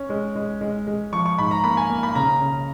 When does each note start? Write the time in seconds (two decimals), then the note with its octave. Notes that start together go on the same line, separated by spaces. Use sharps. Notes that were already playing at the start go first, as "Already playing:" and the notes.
Already playing: C#4
0.09 G#3
0.35 G#3
0.61 G#3
0.87 G#3
1.12 F3 C#6
1.26 C#6
1.38 G#2 B5
1.51 A#5
1.64 A#3 B5
1.77 G#5
1.89 A#3
2.03 B5
2.15 C#3 A#5
2.41 C#3